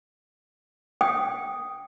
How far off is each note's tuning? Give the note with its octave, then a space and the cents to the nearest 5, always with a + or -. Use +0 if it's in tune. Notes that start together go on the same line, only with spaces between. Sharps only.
G5 +0 D#6 +0